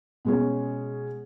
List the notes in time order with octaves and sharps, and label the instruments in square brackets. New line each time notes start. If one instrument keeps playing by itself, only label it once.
[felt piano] B2 G#3 C#4